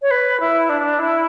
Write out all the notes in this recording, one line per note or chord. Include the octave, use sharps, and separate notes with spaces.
C#5
B4
E4
D4
E4